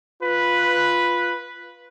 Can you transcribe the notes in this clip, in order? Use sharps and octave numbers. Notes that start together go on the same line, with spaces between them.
F4 B4